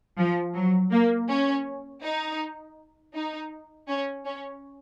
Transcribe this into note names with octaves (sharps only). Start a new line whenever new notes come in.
F3
F#3
A#3
C#4
D#4
D#4
C#4
C#4